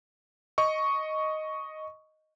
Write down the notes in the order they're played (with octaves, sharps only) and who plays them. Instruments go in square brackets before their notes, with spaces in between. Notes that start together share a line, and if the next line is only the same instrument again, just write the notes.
[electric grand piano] D#5 C#6